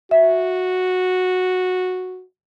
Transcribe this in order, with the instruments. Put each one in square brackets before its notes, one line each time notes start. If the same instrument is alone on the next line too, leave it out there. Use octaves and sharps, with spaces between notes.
[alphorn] F#4 [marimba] E5